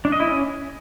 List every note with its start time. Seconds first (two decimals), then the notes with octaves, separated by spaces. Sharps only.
0.05 D4
0.12 D#5
0.20 E4
0.27 C#4